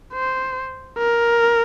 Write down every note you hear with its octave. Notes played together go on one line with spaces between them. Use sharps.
C5
A#4